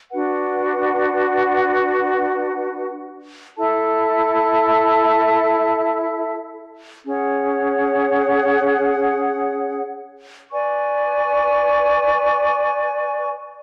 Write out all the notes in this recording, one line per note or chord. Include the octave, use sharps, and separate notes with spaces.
D4 F#4 B4 F#5
E4 A4 E5 A5
C#4 G#4 C#5 F#5
B4 D5 G#5 C#6